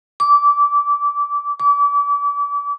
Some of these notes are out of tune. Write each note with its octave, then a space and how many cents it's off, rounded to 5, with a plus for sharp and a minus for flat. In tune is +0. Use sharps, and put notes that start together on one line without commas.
D6 -20
D6 -35